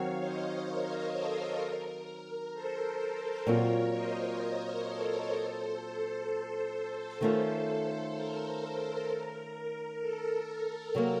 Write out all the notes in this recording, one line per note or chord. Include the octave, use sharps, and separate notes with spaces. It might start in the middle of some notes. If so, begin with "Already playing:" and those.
Already playing: D#3 F#3 C4 C#5 F5
C5 D#5
A#4
A4 C5
A#4
A4 C5
A#2 F#3 C4 F4 A#4 C#5
C5 D#5
A#4 C#5
A4 C5
D#3 A3 C#4 F4 A4 C5
A#4
A4
C3 F#3 A#3